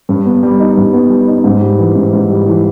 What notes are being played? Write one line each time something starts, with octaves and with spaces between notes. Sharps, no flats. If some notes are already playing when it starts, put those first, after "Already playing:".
G2
B3
G3
D#4
G2
B3
G3
D#4
G#2
G3
E3
G#2
G#2
G3
E3